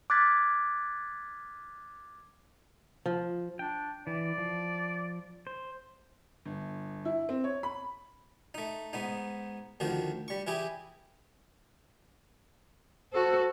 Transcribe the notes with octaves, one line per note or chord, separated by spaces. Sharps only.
D6 F6 F#6 G#6 A6 B6
F3
D4 G5
E3 D5
F3
C5
G1
E4
C4
C#5
B5
A3 D#4
G#2 B3 D#4
D2 D#3 F3 F#4
G3 C#6
E3 E4 G4 G#4
F#4 A4 C5